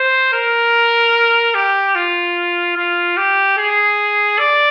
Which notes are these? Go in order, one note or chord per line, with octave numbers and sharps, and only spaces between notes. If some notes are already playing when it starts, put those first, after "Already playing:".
Already playing: C5
A#4
G4
F4
F4
G4
G#4
D5